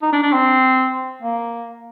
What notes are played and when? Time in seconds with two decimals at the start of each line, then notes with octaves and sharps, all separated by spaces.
0.02 D#4
0.12 D4
0.22 D4
0.32 C4
1.22 A#3